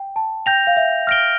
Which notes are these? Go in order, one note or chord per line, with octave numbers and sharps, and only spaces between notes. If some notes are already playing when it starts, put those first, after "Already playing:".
Already playing: G5
A5
G5 G6 A#6 F7
F5
E5
F6 A#6 D7 G7